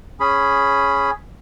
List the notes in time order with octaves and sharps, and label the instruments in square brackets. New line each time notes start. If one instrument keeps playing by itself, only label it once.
[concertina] C#4 G#4 B5